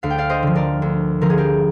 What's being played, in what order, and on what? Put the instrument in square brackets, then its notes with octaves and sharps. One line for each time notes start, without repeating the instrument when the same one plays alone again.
[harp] D2 F5
G5
D5 F5
C5 D#5
D3 F3
A#4 D5
D2
D3 F3 A#4
G#4
G4 A#4